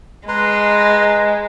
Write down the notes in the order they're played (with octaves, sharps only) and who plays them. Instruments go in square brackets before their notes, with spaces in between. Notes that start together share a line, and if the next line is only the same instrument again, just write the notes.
[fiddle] G#3 [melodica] B4 A#5 C6